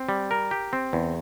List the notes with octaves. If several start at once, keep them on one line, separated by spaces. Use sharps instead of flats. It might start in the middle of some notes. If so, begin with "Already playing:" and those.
Already playing: C4
G3
A#4
G4
C4
E2